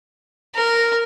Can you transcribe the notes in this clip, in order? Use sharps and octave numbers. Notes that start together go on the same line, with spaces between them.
A#4